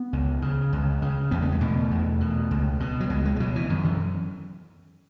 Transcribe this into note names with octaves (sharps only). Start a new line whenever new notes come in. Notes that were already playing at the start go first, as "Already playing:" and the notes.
Already playing: B3
C#2
C#3
C#2
C#3
E2 B3
A3
G#3
B2 A3
E2
B2
C#2
B2
F#3
C#2 G#3
G#3
G#3
B2 F#3
E3
F#2 D#3
E3